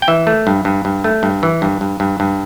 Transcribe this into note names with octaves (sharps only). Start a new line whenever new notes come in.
G5
E3 E5
A3
G2
G2
G2
A3
G2
E3
G2
G2
G2
G2